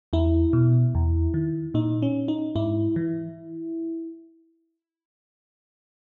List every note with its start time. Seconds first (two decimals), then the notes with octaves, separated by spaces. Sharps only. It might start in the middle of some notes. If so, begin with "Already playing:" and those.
0.13 E2 E4
0.53 B2
0.95 E2
1.34 D#3
1.74 A#2 D#4
2.02 C#4
2.28 D#4
2.55 G#2 E4
2.96 E3